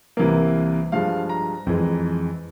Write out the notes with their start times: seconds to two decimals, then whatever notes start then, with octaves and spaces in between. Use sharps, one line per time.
0.17 C2 C3 E3 A#3
0.92 G2 F3 G#3 F5
1.29 A#5
1.67 F2 E3 G#3